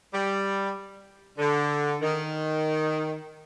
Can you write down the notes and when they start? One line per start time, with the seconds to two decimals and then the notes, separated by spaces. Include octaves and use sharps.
0.14 G3
1.39 D3
2.02 D#3